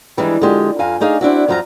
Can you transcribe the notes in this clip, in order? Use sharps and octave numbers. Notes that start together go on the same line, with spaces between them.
D#3 E3 G3 G#3 D4
D3 F3 G#3 G4
F2 F5 G#5 A#5
A3 D4 D#4 G#4 F5
C4 D4 E4 F#4
F2 F3 F#3 F4 A5 A#5